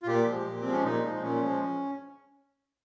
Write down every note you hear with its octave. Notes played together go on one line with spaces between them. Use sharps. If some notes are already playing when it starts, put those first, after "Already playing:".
F4
A#2 G4
F3 G#3
A#2
F3 G#3 C4
C#4
A#2 D#4
F3 G#3
A#2 C#4
F3 G#3